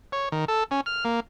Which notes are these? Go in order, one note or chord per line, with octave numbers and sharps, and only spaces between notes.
C#5
D#3
A4
C#4
F6
A#3